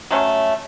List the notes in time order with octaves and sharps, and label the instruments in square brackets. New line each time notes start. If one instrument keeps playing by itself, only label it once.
[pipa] F#3 A3 C#4